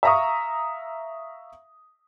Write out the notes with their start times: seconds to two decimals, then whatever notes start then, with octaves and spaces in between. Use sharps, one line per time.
0.03 E5 F5 A#5 C#6 D#6